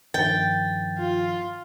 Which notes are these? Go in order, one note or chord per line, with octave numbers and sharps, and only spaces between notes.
G2 D#3 F3 G5 A6
F4